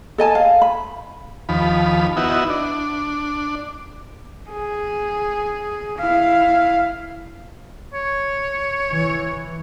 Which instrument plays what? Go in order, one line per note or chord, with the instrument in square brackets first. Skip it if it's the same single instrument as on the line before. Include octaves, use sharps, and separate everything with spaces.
[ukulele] A4 D#5 G#5 A5
F5
B5
[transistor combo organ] D#2 F3 B5
B3 D#4 E4 F#4
D4
[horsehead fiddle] G#4
E4 F5
[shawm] C#5
[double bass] E3